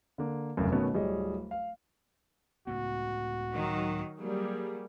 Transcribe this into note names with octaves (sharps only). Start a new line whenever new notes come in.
D3 A#3
F1 C2 F#2 C#3
B2 D#3 A3 B3 C#4
D1 G3 G#4 C#5 D#5
F5
C#2 A2 B3 F#4
D#3 F#3
F#3 G3 A#3 G#4